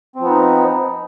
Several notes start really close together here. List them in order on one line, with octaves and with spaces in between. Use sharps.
C4 F3 B3 D#4